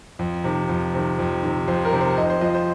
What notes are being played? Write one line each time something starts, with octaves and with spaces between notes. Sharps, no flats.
F2
C3 D#3
F2
C3 D#3
F2
C3 D#3
F2 C5
A#4
C3 D#3
C5
F2 D#5
C5
F3 D#5
C5